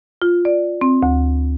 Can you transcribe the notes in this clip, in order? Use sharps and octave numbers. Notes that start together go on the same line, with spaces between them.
F4
D5
C4
D2